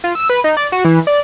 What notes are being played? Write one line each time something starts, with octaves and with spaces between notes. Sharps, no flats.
F4
E6
B4
D#4
D5
F#4
E3
D5